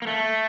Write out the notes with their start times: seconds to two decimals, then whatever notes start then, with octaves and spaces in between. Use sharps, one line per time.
0.02 A#3
0.07 A3